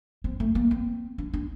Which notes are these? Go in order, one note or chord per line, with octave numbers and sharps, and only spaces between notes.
C4
A3
A#3
C4
D4
D4